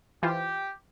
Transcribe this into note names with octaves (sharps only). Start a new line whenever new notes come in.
E3 F4 G4 C5